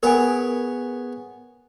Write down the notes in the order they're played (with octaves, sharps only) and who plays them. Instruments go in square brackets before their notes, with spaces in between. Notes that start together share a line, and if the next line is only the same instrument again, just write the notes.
[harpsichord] B3 G#4 C#5 [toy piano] A#4 G#5